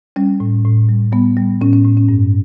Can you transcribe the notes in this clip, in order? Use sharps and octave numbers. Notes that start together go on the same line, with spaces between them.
G3 C#4
A2
A2
G3
G3 B3
G3
A2 C#4
C#4
A2
C#4
G2